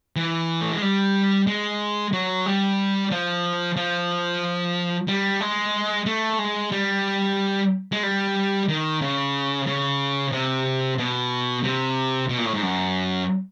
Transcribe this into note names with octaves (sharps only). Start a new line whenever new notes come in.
E3
A3
G#3
G3
G#3
F#3
G3
F3
F3
G3
G#3
A3
G#3
G3
G#3
G3
D#3
C#3
C#3
C3
B2
C3
B2
A#2
A2
G#2
F#2